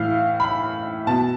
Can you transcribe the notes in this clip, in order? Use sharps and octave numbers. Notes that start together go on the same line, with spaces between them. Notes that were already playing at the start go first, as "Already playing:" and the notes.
Already playing: A2 E3 F5
B5
B2 A5